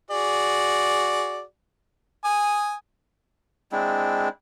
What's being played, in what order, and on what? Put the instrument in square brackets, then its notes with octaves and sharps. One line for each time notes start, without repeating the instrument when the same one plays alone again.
[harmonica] F#4 G#4 D5
G#5 D#6
[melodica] G#3 C4 D4 E4